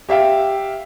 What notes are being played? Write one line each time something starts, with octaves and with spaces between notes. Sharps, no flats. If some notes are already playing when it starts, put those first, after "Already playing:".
G4 E5 F5 G5